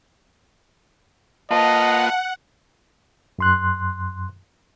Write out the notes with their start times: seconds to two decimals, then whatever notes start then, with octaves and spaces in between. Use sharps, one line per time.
1.51 A#3 F4 B4 D#5 F5 F#5 A5
3.39 F#2 C6 F#6